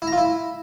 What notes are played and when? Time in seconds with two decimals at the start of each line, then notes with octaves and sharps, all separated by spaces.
0.02 E4
0.07 A#5
0.13 F4
0.18 E4